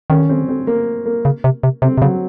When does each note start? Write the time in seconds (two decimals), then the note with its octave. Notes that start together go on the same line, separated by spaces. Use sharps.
0.10 D#3 C#4
0.29 C4
0.49 C4
0.67 A#3
1.06 A#3
1.25 C#3
1.44 C3
1.63 C3
1.82 C3 C4
1.98 C3
2.02 C#3 F#3